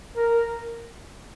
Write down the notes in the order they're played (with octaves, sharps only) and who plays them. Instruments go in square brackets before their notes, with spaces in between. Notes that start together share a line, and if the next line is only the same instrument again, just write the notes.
[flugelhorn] A#4